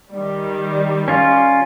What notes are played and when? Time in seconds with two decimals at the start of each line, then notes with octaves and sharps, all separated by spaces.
0.13 D#3 G3
1.08 C#4 F4